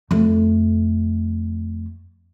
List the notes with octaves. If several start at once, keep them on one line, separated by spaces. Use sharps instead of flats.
F2 A3